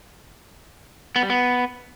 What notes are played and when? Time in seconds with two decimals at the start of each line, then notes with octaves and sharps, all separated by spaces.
1.16 B3
1.23 G3
1.30 B3